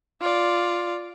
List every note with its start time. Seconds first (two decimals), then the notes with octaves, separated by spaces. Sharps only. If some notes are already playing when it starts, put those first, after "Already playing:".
0.21 F4 D5